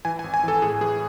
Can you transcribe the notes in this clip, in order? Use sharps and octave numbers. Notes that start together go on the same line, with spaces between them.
E3 G#5
G#5
G#1
G#5
E3 A4
A2 G#4
E3 G#4